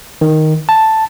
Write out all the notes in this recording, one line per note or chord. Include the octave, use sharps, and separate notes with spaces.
D#3
A5